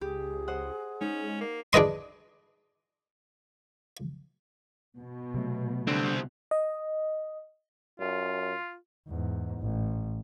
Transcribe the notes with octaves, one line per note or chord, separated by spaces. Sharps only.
C#2 G4 G#4
C5 D#5 F#5
G#3 C#4 D#4
A#3
D4 G#4 B4 D#5 C6
B2
C3 F#3 A3
C2 D3 C4
D#5
F#2 F4
E2 G#2
A1